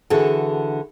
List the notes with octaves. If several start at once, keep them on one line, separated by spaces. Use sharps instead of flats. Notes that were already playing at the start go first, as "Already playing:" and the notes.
D3 E3 F#4 G#4 A4